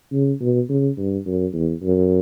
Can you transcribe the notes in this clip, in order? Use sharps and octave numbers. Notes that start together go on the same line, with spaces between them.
C#3
B2
C#3
G2
F#2
E2
F#2